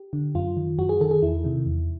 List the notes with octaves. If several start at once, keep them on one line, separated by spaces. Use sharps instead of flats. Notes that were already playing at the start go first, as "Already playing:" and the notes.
Already playing: G4
D3
F#2 F4
D#3
F#2 F#4
G#4
D#3 A4
G#4
E2 E4
C3 D#3
E2